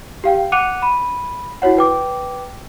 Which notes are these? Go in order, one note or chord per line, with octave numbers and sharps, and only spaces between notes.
G4 F5 G5
F#5 D6 F#6 C#7 D#7 F7
B5 D#7
E4 F#4 C#5 F#5
B4 G5 D6